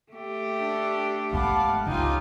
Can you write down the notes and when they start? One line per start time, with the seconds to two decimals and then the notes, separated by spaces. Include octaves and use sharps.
0.12 A3 G4
0.59 D4
1.33 G1 G#3 F5 F#5 A5 B5 D6
1.87 C#2 C#4 D#4 F4 G4